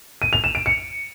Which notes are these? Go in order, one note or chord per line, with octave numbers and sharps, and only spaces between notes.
D#7
F7
E7
D7
C#7